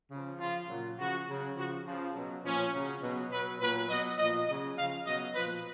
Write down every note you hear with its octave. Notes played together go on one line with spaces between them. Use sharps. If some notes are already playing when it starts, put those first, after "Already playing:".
C#3 F3
C#3 F3 F4
A#2 F#3
C#3 F3 F#4
C#3 F#3
C#3 F3 F#4
C#3 F3
B2 F#3
A#2 F3 C#4
C#3 F#3
B2 F#3
B2 F#3 B4
A#2 F#3 B4
B2 F#3 D#5
A#2 F3 D#5
C#3 F#3 D#5
C#3 F3 F5
B2 F#3 D#5
A#2 F3 B4